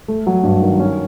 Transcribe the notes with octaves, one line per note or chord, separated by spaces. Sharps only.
A3
F#3
G2
D#3
C#4